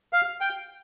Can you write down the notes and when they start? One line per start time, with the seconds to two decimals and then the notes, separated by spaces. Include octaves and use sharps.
0.13 F5
0.41 G5